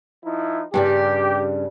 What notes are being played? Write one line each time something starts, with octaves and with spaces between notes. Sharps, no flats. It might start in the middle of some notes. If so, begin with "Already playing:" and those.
F3 D#4 E4
G2 C#3 G3 G4